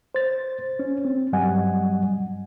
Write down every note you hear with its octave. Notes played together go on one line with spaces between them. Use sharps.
C5 A6
C#4
C4
G2 F#3 G3 D#5 F#5 G#5